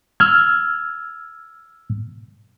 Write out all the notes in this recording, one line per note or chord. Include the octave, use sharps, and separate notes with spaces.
E6 F6 G#6